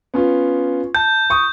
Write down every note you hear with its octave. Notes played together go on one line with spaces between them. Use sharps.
B3 C#4 F4
A5 G6
C#6 D#6